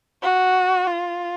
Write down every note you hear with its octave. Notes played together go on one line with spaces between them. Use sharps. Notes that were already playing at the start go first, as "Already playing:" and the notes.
F#4
F4